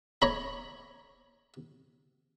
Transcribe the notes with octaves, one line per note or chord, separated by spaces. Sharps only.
C#5 A#5 B5